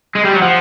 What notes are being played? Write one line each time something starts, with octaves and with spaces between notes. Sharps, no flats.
G#3
G3
F#3
F3 F#5